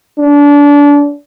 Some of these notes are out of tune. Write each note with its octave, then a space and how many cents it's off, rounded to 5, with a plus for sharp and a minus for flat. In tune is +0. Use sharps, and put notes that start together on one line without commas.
D4 -30